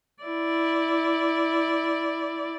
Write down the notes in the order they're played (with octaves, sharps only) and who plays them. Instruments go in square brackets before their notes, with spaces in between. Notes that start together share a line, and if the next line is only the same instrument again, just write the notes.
[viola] E4 D5